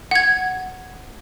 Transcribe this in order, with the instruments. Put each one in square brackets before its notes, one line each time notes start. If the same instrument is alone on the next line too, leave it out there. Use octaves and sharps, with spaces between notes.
[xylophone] F#5 G#6